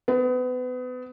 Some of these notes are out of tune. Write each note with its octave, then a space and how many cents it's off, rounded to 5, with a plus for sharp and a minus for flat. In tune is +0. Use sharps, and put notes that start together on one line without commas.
B3 +30